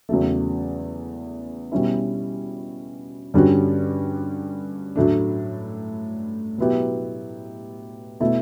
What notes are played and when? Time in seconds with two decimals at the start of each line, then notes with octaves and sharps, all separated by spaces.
0.09 E2 C#3 F#3 A3
1.72 B2 G3 C#4 E4
3.34 G2 D3 G3 C#4 F#4
4.96 A2 F#3 A3 D4
6.58 B2 F#3 B3 E4 G4
8.20 B2 A3 E4